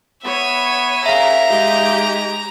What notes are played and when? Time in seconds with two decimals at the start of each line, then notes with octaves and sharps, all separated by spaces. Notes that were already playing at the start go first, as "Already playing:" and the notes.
0.24 B3 C#5 E5 D#7
1.06 C#3 A#4 E5 F5 A#5
1.49 G#3 D#4 G4